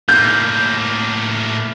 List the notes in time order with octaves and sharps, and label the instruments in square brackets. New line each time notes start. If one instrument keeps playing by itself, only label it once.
[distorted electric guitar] A2 A#3 [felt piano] G6